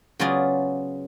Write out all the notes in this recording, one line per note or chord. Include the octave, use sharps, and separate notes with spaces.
C#3 F#3 B3 F4 G#4 D5